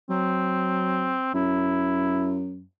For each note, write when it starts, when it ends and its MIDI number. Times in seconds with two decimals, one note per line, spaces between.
0.10 1.18 54
0.10 1.32 60
1.34 2.63 42
1.34 2.40 64